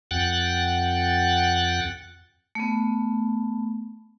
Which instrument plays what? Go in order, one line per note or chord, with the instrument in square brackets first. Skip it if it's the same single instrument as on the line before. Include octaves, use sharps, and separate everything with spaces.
[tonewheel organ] F2 F#5 G5 F#6 A6
[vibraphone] A3 B3